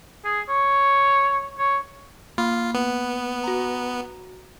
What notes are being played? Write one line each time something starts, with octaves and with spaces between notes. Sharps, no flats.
G#4
C#5
C#5
A#3 F4 B5
B3
F#4 A#5